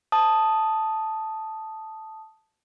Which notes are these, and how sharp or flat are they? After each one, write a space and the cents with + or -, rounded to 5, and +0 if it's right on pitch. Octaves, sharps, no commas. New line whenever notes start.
A5 +0 D#6 +0